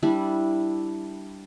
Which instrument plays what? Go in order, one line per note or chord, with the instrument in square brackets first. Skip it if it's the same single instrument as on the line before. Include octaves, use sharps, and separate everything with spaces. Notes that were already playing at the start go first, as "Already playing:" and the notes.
[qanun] G3 D4 E4